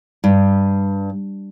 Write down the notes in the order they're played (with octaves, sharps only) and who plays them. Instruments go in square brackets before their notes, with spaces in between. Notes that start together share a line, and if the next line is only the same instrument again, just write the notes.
[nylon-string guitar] G2